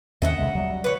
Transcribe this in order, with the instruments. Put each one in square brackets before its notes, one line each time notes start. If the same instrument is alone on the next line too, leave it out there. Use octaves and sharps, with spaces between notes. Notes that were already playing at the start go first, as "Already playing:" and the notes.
[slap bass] D#2 D3 C#4 [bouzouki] D#5 E5 F#5
[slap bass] B1 C#3 G#3
F#3 G3
[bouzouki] B4 C#5